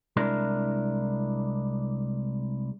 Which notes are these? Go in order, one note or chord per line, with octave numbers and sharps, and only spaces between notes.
C2 G#3 D4 E4 A#4